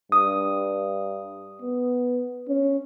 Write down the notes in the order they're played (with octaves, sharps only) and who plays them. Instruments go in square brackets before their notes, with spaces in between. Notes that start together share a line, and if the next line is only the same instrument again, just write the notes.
[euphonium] G2 [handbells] D#6
[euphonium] B3
C#4